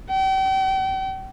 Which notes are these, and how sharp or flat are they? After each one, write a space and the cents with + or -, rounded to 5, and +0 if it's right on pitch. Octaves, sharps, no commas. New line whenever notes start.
G5 -40